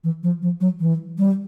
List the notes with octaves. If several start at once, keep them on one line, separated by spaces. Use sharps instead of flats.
E3
F3
F3
F#3
E3
G3